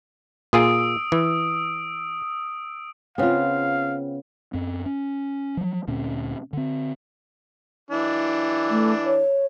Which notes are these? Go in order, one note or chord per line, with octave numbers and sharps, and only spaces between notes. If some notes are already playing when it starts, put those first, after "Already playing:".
A#2 F4 G#4 D#6 E6 D7
E3
C#3 B3 C4 F4 F5
F#2 C4
C#4
F3 F#3
D2 A#2 C4 C#4
D3 C4
E3 D4
A3
C#5